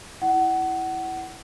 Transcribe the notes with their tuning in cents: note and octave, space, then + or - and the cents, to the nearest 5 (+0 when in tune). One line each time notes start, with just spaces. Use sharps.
E4 +0 F#5 +20